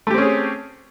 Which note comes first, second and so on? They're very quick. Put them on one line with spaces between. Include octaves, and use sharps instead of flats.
A3 G4 C4 C#4 G#4